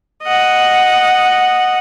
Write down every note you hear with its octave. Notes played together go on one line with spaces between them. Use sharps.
D#5 F#5